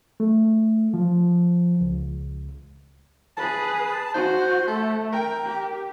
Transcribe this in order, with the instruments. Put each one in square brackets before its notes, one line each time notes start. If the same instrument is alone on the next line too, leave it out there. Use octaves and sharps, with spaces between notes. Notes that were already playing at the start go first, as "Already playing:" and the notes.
[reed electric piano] A3
F3
C#2
[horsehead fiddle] G#4 B4 [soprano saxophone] A5
[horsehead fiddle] F#4 [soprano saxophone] C5
[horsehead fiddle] A3 [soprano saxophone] A4
[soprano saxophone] A#4 [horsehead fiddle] G5
[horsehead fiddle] G4